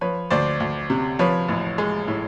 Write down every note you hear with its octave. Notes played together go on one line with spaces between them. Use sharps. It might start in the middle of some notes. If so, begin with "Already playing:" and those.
F3 B4 C#5
D2 C5 D5
D2
C3
F3 B4 C#5
A1
G#3
A2